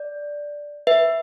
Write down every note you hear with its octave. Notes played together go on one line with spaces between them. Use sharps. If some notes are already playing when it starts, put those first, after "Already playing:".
Already playing: D5
B4 E5